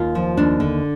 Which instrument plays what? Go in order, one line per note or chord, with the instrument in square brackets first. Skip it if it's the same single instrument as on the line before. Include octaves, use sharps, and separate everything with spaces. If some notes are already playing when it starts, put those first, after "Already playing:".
Already playing: [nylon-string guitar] D#2 F4
F3
D#2 D4
D3